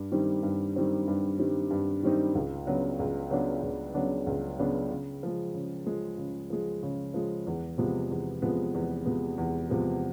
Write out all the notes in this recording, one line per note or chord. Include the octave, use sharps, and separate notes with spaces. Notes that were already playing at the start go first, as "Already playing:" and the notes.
Already playing: G2
D#3 G3 C4 D#4
G2
D#3 G3 C4 D#4
G2
D#3 G3 C4 D#4
G2
D#3 G3 C4 D#4
C#2
C#3 F#3 B3 D4
C#2
C#3 F#3 B3 D4
C#2
C#3 F#3 B3 D4
C#2
C#3 F#3 B3 D4
C#3
F3 G#3
C#3
F3 G#3
C#3
F3 G#3
C#3
F3 G#3
E2
C3 F3 G#3 B3
E2
C3 F3 G#3 B3
E2
C3 F3 G#3 B3
E2
C3 F3 G#3 B3